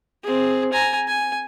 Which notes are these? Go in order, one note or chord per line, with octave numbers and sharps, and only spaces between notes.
C4 G#4
G#5 A#5
G#5